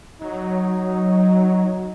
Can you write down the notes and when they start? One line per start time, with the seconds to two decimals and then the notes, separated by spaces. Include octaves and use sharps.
0.21 F#3 D#4